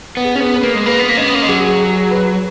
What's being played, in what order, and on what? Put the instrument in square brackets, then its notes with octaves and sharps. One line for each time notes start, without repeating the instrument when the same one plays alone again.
[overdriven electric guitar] B3
[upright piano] G#4
[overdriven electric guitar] C#4
B3
[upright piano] B4
[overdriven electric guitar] A#3
G#3
[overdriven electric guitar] A#3 [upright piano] B4
[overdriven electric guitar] B3
A#3
[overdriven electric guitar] G#3 [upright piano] C#4
[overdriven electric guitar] B3
A#3
G#3
[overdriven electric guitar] F#3 [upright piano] G#4
[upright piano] G#4
B4